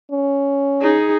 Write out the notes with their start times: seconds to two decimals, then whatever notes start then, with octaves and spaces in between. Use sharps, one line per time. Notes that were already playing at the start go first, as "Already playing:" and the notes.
0.11 C#4
0.81 D#4 G#4